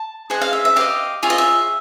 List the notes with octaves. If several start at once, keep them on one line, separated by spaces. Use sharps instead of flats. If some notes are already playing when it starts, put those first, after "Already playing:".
Already playing: A5
G#4 C5 D#5 F#5
F5
E5
E5
G4 B4 D#5 F5
F4 G#4 C#5 E5
D#5
E5